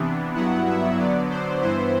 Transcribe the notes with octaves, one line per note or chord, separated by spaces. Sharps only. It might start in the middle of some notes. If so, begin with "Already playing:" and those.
Already playing: C3 E3 B3 D4
G2 F#3 B3 E4 F#5
E5
D3 F#3 B3 D5
C5
G2 E3 B3 E4 C5